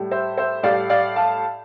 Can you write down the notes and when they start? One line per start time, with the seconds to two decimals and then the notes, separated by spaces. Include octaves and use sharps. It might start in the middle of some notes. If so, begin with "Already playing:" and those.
Already playing: A2 G3
0.11 C5 E5
0.37 C5 E5
0.63 A2 G3 D5 F5
0.89 D5 F5
1.16 F5 A5